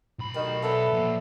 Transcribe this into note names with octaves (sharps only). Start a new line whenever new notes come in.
B1 B5
D2 D#3 G3
B3 D4 A4 C#5 E5
F3 A#3